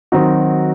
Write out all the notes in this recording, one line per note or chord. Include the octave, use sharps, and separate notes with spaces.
D#3 F#3 C4 D#4 F#4